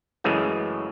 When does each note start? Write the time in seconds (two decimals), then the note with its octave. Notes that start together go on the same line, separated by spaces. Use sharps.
0.24 F#2 C#3 E3 G#3 A3